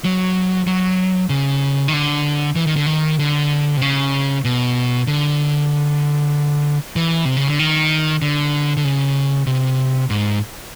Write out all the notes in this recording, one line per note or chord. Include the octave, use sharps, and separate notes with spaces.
F#3
F#3
C#3
D#3
D3
E3
D#3
D3
D#3
D3
C3
C#3
B2
D3
E3
C3
C#3
D3
D#3
D3
D3
C#3
C3
G#2